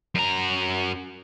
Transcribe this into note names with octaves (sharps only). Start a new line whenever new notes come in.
F#2 A#5